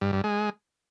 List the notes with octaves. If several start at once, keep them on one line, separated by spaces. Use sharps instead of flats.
G2
G2
G#3